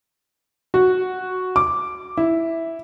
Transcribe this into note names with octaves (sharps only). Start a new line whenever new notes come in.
F#4
D6
E4